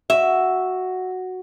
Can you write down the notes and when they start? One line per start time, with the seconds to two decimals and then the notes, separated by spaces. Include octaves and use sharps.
0.10 F#4 E5